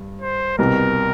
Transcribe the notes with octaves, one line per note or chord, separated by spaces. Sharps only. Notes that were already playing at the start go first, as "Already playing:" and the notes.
Already playing: G2
C5
C2 B2 G3 C4 A#4